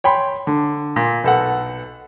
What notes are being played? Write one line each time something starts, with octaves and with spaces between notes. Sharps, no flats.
C#5 G5 B5 C6
D3
A#2
B1 A4 F#5